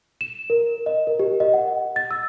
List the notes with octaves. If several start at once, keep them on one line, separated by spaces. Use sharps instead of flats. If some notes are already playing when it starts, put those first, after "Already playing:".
E7
A#4
D#5
A#4
G4
D#5
F#5
A6
E6